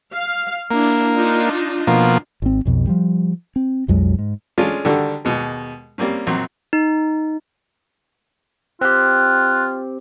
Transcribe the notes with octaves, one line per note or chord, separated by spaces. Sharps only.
F5
A#3 D4 E4
D4 D#4 F4
B2 F3 A#3
G#1 C4
B1 F2 B2
F3 G3
C4
B1 F2 F#3 G#3
G#2
G#3 C#4 D4 F4 A4
D3 D#3 G3 F#4 A4
D#2 B2 G#3
G3 A#3 C4 C#4
A#1 F#3 C4 C6
D#4
C4 F4 G4 F#6